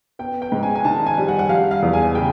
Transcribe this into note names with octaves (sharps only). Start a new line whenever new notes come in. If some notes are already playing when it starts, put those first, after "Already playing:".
B3 G5
G5
G#2
G#5
G#5
D#3 A5
G#5
G3
F#5
F#5
G3 F5
F5
E2
G#5
C#3 G5